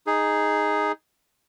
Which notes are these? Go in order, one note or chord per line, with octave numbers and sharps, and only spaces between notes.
D#4 G#4